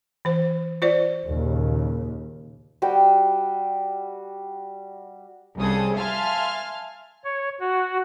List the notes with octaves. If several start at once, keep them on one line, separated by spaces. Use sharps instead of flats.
E3 C5
F4 C5 D5
D#2 A#2 C#3
G3 F#4 G5 E6
C2 C#3 C4 G#4 A4 D#6
E5 F5 G#5 A5 C6 F6
C#5
F#4